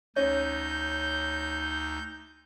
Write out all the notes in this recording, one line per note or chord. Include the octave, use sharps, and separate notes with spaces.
D2 C#4 D#4 G6 A#6